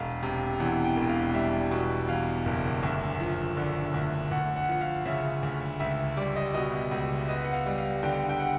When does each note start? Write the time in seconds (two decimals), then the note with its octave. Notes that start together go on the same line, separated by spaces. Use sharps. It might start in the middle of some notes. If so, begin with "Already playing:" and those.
Already playing: E1 F5
0.23 C3
0.59 E2 F#5
0.84 G5
0.97 E1
1.09 F5
1.34 G3 E5
1.71 B2
2.08 E2 F5
2.45 F#1
2.83 D2
3.20 F3
3.57 D3
3.94 D2
4.31 D2 F#5
4.56 F#5
4.68 F3 F#5
4.81 F5
5.06 C#3 E5
5.43 D2
5.80 C#2 E5
6.17 G3 D5
6.36 D#5
6.54 B2 D#5
6.91 C#2
7.28 B3 D#5
7.45 F#5
7.53 F5
7.66 G3
7.78 F5
8.03 D3 G5
8.29 G5
8.40 F#5